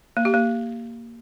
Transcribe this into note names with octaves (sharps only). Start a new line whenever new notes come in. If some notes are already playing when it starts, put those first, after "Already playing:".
A#3
G4
A#3